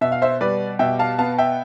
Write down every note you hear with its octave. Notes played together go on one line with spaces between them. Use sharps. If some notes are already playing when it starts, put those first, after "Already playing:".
B2 E5
F5
C5 E5
G3 B4 D5
B2 E5 G5
F5 A5
B3 F5 A5
E5 G5